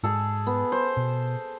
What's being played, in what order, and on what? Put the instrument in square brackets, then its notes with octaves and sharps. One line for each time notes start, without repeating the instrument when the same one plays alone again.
[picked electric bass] G#2 [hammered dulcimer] G#4 A4
[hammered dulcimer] B3
C5
[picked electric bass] B2